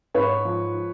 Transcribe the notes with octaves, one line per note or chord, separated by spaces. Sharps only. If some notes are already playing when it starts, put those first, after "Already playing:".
G#2 B4 C#5
F3